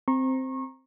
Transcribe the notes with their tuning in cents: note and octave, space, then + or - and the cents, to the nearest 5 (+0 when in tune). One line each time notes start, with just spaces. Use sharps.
C4 +0 A#5 +0 C#6 -35